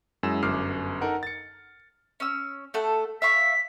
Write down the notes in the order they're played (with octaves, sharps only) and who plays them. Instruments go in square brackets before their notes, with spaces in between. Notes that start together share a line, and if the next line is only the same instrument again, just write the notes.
[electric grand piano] F#2 G#3 E4 E6 E7
G1 F#2 D6 F6 C7
D#4 A4 A#4 F#5
A6 C#7
[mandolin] C#4 E6
A3 A4 F#5
[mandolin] E5 F5 C#6 [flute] B6